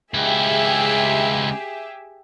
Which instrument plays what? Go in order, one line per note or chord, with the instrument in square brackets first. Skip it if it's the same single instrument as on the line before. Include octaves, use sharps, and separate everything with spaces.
[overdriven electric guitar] C#2 E4 [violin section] G4 G#4 E5